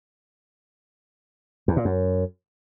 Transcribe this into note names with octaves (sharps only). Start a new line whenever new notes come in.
E2
A#2
F#2